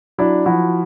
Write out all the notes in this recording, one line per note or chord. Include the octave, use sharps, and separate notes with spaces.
F#3 D4 E4
F3 E4 F#4